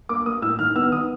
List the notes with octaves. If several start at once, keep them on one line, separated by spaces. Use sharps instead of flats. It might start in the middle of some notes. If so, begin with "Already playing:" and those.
A#3 D6
A#3 D#6
A2 E6
D#3 F6
B3 E6
D#3 D#6